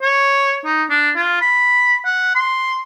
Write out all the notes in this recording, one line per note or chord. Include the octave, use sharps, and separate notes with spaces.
C#5
D#4
D4
F4
B5
F#5
C6